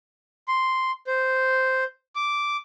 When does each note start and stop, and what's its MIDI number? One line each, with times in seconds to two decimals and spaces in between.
0.48 0.91 84
1.07 1.84 72
2.16 2.57 86